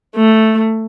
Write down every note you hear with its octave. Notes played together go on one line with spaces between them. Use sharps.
A3